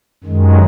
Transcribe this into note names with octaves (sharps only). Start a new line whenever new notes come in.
F#2 D#3 G#3